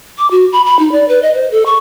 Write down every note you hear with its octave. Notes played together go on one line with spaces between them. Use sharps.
D6
F#4
B5
B5
D#4
D5
B4
D#5
C5
A4
C#6